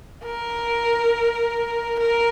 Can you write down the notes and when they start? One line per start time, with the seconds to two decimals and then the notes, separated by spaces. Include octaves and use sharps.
0.24 A#4
1.99 A#4